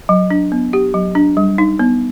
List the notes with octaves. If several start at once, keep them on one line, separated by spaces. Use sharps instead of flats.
F#3
D4
B3
G4
F#3
D4
G3
D#4
B3